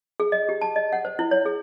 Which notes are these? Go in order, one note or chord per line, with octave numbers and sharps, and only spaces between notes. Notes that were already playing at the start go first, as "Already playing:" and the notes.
G#4
D#5
G4
A5
D#5
F#5
C5
E4
C#5
G#4